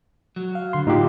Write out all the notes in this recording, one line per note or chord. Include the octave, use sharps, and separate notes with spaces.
F#3
F5
D3 C6
A2 D#4 F4 G4